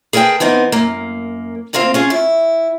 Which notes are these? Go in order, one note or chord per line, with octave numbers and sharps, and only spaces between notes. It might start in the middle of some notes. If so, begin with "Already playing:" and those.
G#4 A#4 B4 D#5 G5 A5
E3 B3 C4 D#4
F#2 A#3
D2 A#3 C4 F4 F5
C#4 F4 G#4
E4